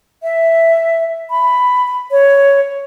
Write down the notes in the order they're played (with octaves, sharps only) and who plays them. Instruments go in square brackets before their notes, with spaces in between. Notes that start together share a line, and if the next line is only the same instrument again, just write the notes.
[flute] E5
B5
C#5